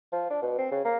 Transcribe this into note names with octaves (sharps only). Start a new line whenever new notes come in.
F3
D4
B2
C4
C#3
A#3